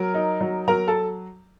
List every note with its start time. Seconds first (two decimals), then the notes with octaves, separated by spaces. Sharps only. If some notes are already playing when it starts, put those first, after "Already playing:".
Already playing: F#3 A#4
0.14 D#4
0.41 F#3
0.68 F#3 A#4 A#5
0.88 A4 A5